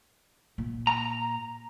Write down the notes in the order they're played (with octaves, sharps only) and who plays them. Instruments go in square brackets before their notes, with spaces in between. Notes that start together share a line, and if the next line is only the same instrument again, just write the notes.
[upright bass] A#2
[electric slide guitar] A#5